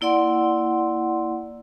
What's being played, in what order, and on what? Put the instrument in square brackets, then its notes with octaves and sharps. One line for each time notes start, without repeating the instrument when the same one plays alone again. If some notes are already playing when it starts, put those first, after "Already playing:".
[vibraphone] A#3 E4 D5 F#5 C6